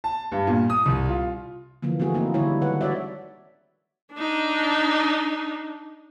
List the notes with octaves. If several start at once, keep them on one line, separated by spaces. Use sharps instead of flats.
A5
G2
A#2
D#6
C2
F4
D3 E3 F3 A#3
A3 C4 F#4 G#4
A#3 D#4 E4
D3 G3 G#3 D4 E4 C#5
D#3 B4 F#5
F#4 C#5 D5 E5
D4 D#4